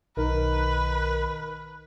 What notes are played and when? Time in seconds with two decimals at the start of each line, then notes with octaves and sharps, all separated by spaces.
0.17 B1 D#3 A#4 B4